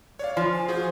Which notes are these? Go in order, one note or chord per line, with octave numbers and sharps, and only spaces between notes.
C#5 D5 F5
F3 F4 C6
G#5
F4 F#4 G#4 C5